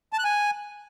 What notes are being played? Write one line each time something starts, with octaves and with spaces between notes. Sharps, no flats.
A5
F#6
G#5